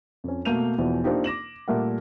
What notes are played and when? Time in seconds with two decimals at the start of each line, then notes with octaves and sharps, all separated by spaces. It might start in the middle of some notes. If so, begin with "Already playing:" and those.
0.24 F2 C#4
0.45 B2 A3 A#3 G6 D#7 F7
0.78 E2 B2 E3 F3
1.04 A#3 C4 D4 D#4 F4 G4
1.24 D6 A#6 E7 F#7
1.68 A#2 G3 A3 A#4 E5 F#5